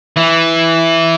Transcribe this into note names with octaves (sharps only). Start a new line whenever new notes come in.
E3